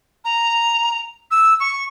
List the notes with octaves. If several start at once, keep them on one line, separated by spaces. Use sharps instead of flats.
A#5
E6
C#6